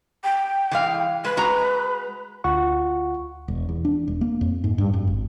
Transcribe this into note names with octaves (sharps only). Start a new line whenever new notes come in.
G5
E3 G#3 F5
G#3 B4
G#3 F#4 A#5
D2 F4 F#5 C#6
E1
E2
D4
E1
A#3
F2
G#2
G2
F#2
G#1